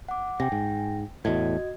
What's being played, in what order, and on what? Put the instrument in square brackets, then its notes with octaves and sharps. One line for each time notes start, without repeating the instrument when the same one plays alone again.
[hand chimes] F#5 D6
[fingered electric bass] C3 [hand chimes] G5 G#5 A#6
[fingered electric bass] G#2
[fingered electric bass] E2 A2 [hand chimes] F#4 D#5 G#6